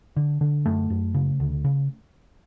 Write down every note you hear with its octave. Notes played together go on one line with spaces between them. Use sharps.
D3
D3
F#2 A3
F#2
C#3
D2
C#3